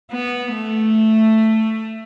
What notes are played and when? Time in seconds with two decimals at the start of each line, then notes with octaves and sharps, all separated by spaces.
0.12 B3
0.54 A3